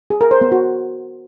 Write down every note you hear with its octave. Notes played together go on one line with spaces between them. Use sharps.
G#4
A#4
C5
B3
F#4